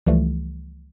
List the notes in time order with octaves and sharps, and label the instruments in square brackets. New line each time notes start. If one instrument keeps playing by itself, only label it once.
[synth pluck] C#2 E3 F3 G3 A3